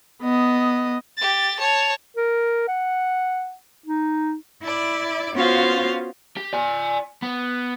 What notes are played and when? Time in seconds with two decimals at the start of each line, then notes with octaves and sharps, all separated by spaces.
0.22 B3 D#5
1.17 G4 A6
1.60 C#5 A5
2.16 A#4
2.68 F#5
3.86 D#4
4.64 E4 D5
5.36 B3 C#4 F4 F#4 C5 F5
6.37 G4
6.53 D5 G#5
7.22 B3